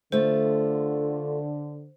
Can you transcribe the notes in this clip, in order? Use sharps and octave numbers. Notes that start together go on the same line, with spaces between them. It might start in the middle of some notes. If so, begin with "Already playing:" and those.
D3 A3 F4 C5